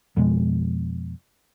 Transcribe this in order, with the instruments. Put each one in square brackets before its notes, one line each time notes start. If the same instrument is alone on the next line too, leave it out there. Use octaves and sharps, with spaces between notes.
[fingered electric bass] F2 B2 G#3